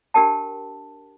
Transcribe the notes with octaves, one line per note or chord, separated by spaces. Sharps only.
D4 G4 A#4 G5 A5